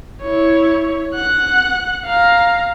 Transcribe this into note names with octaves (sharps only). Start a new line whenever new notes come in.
E4 C#5
F#5 F#6
F5 A#5